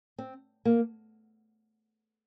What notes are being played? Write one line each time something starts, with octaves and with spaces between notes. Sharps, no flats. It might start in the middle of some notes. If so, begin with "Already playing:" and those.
C4
A#3